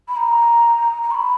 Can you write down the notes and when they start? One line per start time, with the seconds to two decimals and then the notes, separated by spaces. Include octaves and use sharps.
0.08 B5
0.16 A#5
1.03 A#5
1.11 C#6
1.14 B5